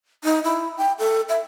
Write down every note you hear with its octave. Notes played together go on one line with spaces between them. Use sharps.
D#4
E4
G5
A4
E5